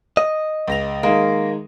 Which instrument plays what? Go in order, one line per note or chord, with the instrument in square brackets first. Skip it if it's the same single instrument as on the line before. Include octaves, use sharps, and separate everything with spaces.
[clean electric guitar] D#5
[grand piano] C#2 A#6 F7
[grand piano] D#3 G#3 [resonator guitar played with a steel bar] A#3